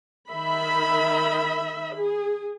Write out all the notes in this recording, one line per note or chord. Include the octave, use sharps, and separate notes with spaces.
D#3 E5 B5
G#4